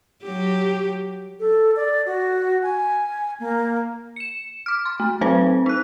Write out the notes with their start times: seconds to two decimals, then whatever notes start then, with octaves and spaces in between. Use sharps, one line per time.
0.24 F#3 G4
1.40 A4
1.76 D5
2.06 F#4
2.62 G#5
3.40 A#3
4.16 C#7 E7
4.66 D6 F6
4.85 C6
5.00 A3
5.21 F#3 C4 B4 C5
5.66 D#4 F#6